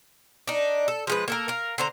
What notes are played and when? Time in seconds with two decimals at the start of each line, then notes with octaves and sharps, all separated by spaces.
0.47 D4 D#4
0.88 A4
1.07 F3 G#3 B4
1.28 A#3 A4 A#4
1.48 A#4 F5
1.78 D3 C5 A#5